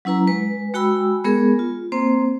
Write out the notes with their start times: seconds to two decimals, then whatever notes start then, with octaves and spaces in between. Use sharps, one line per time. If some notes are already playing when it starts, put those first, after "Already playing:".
0.05 F#3 C#4 E4 B4 A#5
0.28 G#3 B4
0.74 G#3 F#4 G5 B5 E6
1.24 G#3 B3 G#4 A#4
1.59 F4
1.92 A#3 C4 C5